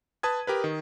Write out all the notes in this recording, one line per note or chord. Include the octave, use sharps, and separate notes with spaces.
B4 A5 D#6 G#6
G4 A#4 B4
D#3